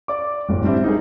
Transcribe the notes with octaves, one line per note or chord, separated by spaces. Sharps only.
D5 D6
D1 G1
G3 C4 D4 E4
D#4 G#4